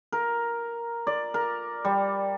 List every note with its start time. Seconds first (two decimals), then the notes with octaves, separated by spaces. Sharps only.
0.12 A#4
1.07 D5
1.34 A#4
1.85 G3